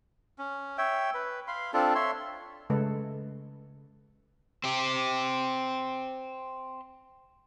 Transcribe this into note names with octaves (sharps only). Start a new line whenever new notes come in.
C#4
C#5 E5 G5
B4
F5 B5 C6
C4 D4 F4 A4
C#5 E5 C6
C#3 G#3 A3 A4 B4
C4 G4